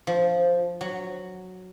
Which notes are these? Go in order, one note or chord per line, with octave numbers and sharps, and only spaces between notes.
F3
F#3